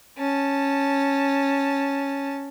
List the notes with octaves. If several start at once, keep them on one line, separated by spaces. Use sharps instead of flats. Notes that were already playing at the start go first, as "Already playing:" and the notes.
C#4 A5